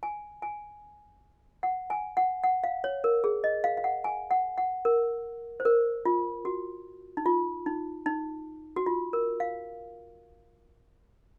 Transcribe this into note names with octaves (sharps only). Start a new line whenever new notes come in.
G#5
G#5
F#5
G#5
F#5
F#5
F5
C#5
A#4
G#4
D#5
F5
F5
F#5
G#5
F#5
F#5
A#4
C5
A#4
F4
F#4
D#4
F4
D#4
D#4
F#4
F4
A#4
F5